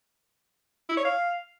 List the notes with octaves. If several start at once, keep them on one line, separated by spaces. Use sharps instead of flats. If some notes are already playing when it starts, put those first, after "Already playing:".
E4
C#5
F5